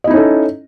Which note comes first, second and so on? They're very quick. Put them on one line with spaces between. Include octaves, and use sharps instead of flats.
D#5 E4 D#4 C#4 A4